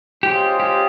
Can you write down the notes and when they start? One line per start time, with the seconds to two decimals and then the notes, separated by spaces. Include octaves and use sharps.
0.23 G#3 C#4 F4 G4 G#4 C5
0.60 G4